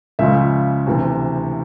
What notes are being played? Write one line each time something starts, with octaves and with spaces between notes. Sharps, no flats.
C#2 C#3 F3 E5
D2 C3 E3